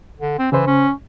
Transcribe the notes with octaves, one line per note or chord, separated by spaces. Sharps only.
D3
C4
C#3 E3 C5
C#4